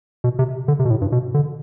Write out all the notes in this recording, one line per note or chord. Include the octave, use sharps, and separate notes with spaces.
B2
C3
D3
C3
B2
A2
G2
B2
D3